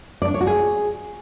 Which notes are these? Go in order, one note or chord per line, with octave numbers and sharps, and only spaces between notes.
D5
D4
C#5
F#4
G#4